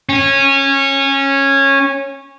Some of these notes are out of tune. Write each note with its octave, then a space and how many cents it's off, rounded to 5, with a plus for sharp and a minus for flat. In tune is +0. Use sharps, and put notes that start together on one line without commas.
C#4 -15